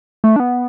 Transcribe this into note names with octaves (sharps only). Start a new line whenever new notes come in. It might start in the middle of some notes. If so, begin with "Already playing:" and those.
A3
D4
B3